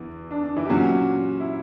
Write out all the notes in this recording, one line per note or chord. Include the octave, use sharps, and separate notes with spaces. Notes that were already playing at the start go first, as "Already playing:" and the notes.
Already playing: E2 E3
D4
D4
E3 E4
G4
A#2 F#3 C#4 F#4
E4